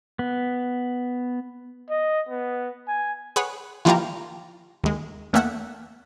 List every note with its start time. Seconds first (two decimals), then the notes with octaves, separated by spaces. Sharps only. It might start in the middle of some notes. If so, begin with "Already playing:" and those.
0.19 B3
1.90 D#5
2.29 B3
2.88 G#5
3.36 G#4 B4 C#5 F#5
3.85 E3 F3 G3 A#3 F4 A#4
4.84 D#2 G#3
5.33 E2 A3 A#3 E5 F#5